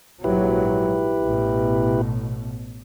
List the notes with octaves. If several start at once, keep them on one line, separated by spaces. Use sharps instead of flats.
A#1 G#2 F#3 E4 G4 B4
A1 B2